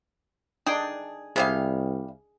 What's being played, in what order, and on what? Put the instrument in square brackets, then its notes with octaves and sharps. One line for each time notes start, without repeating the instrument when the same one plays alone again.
[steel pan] D4 D#4 G5 [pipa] G#4
[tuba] C2 [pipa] C3 G3 F5 [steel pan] G#4